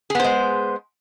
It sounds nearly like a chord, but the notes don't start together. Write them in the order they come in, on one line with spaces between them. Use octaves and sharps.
G#4 B3 C5 G#3